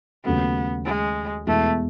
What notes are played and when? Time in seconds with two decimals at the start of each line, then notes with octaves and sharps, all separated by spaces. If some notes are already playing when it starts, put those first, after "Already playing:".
0.25 D#2 C#3 F#3 A3 B3
0.85 G#3
1.47 E2 B2 G#3 A3 B3 E4